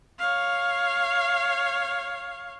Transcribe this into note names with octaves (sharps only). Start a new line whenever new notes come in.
C#5 F5